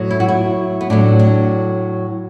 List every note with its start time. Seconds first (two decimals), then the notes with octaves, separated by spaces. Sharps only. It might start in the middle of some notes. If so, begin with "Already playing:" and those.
Already playing: A2 F#3
0.11 E4
0.20 F#4
0.28 E4
0.81 B3
0.90 A2 F#3 D4
1.19 D4